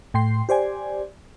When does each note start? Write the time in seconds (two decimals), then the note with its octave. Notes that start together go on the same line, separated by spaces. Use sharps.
0.14 A2 G5 C6 C7
0.49 G4 C5 D5 G#5